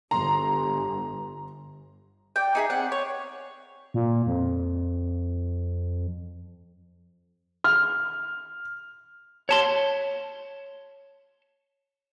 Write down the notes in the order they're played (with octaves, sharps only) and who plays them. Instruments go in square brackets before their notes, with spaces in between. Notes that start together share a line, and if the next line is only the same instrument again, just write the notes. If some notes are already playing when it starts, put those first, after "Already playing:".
[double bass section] G1 [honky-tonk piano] A#5 C6
[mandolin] D5 G5
D#4 G#4 E5
C4 D5 F#5
C#5
[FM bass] A#2
F2
[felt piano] F6
[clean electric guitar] C#5 A5 C6